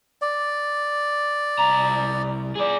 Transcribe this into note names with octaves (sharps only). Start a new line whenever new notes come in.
D5
C2 A#5
G#4 D5